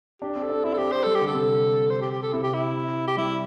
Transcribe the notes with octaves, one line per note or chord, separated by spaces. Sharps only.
D4 G4
C4
A4
D4
C4 E4
A4
C4 G4
C5
G3 A4
G4
D3
A4
C3
C5
G4
G4
A4
C3 E4
G4
E4
G4
G3 E4